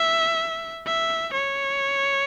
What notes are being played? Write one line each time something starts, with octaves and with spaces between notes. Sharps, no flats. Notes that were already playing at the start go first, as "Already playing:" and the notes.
Already playing: E5
E5
C#5